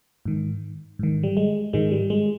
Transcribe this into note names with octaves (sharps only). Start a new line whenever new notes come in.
G#2 D#3
G#2 D#3
G3
G#3
G#2 D#3 G#3
G3
G#3